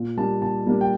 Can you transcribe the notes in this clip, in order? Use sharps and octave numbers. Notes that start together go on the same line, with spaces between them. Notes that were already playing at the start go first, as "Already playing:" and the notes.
Already playing: A#2
G3 A#3 D4 A5
A#2 A5
G3 A#3 D4
G5